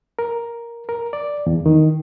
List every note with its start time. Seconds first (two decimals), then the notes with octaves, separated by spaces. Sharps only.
0.19 A#4
0.89 A#4
1.13 D5
1.46 E2
1.66 D#3